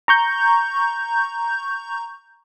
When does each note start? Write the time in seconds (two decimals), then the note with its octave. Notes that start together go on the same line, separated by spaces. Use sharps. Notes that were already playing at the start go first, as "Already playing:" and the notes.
0.08 A#5 C#6 G6